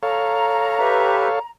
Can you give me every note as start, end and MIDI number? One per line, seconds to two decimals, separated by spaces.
0.03 1.39 69
0.03 1.39 73
0.03 1.39 77
0.03 1.50 82
0.79 1.28 67
0.79 1.28 71
0.79 1.28 76